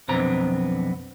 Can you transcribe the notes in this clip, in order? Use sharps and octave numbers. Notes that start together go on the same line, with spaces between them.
B1 F2 D3 B3 C4 A#5